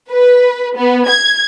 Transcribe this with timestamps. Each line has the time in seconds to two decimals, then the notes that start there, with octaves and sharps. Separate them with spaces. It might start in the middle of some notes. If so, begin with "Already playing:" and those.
0.11 B4
0.77 B3
1.08 G#6